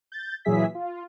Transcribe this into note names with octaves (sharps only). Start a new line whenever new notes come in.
G6 A6
A#2 E3 F#3 G#4 E5 B6
F4